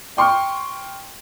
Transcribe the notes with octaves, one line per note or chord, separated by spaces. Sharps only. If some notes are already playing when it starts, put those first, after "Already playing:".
G5 C6 C#6 F6